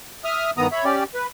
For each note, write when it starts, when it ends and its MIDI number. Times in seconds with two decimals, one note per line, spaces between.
0.24 0.51 76
0.24 0.51 87
0.24 0.51 89
0.57 0.67 43
0.57 0.67 51
0.57 0.67 59
0.57 0.67 82
0.57 0.67 87
0.72 0.84 73
0.72 0.84 76
0.72 0.84 83
0.85 1.04 61
0.85 1.04 67
0.85 1.04 74
1.14 1.27 71